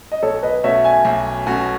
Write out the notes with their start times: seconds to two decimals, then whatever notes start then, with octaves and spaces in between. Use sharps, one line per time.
0.12 D#5
0.23 B1 A4 C#5
0.43 B4 D#5
0.64 B2 A3 C#4 F#4 C#5 E5
0.84 E5 G#5
1.05 B1
1.46 B2 A3 C#4 F#4